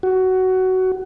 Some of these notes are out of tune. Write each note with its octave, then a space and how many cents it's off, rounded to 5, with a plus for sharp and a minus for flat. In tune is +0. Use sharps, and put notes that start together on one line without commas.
F#4 +15